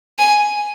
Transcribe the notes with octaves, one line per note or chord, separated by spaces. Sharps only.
G#5